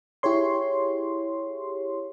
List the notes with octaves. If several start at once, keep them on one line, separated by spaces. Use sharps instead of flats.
E4 G4 G#4 C#5 C6